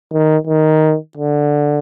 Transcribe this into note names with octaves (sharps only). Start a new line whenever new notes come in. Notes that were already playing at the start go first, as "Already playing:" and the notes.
D#3
D#3
D3